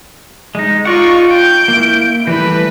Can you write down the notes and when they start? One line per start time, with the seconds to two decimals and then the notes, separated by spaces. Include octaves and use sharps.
0.55 G#3 D#4
0.85 D#4 F4 D5 F#5 C#6
1.31 G5 G6 D7
1.68 A#3 E4
2.27 E3 G3 A3 B4